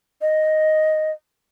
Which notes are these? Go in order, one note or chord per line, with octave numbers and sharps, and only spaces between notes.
D#5